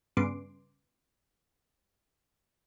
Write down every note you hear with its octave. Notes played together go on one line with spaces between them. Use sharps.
G2 C#3 B3 C6 D6